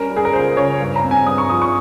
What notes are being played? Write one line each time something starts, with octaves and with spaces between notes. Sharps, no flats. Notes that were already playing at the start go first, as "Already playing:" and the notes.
Already playing: G3 C#4 A#4
G3
G#4
A#4
C#2 C5
C#3 C#5
G2
A#5
C4
G#5
G2 D#6
C#6
F3 D#6
C#6